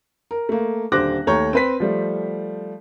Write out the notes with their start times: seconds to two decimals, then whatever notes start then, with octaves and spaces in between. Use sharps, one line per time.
0.31 A#4
0.49 A3 A#3
0.92 D#1 D3 C5 D6 F#6 A#6
1.27 D#2 A3 C#5 A#5 G6
1.53 C4 B4 B6
1.80 F3 G3 A3